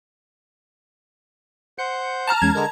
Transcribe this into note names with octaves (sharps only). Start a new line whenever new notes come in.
C5 F#5 G6 C#7
A5 A#5 F6
E2 G#3 C#4 G#6
D3 G#3 A#4 D5